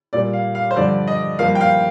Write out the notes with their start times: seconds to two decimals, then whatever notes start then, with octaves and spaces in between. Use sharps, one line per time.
0.13 A#2 G3 A#3 D5
0.33 F5
0.55 F5
0.71 C5
0.76 G2 D3 F3 D5
1.08 D#5
1.39 G2 F3 A#3 F5
1.55 G5
1.61 F5